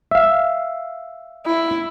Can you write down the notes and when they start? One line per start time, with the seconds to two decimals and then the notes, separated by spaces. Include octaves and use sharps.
0.11 E5 F5
1.46 E4